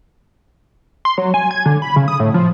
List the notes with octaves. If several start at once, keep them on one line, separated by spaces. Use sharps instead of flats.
C6
F#3
G#5
G#6
D3
B5
C#3
D#6
A2
F3